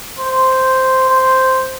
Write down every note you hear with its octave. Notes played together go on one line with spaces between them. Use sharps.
C5
C5